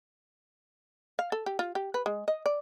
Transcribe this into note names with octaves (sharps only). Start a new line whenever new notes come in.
F5
A4
G4
F4
G4
B4
G#3
D#5
D5